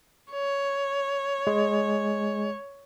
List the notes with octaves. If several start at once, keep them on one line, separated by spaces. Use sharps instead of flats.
C#5
G#3